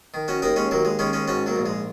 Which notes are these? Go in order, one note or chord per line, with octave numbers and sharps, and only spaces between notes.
D#3
C#4 F#4
D#2 A#3 D#4
G#3 C#4
D#2 F#3 A#3
G#3
D#3 G#3 C#4
G#3 C#4
G#2 C#4 F#4
F#3 A#3
A#1
G#3